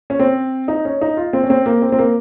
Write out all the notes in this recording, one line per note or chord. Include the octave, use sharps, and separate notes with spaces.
C#4
C4
D#4
C#4
D#4
F4
C4
C#4
C4
A#3
C4
C4
A#3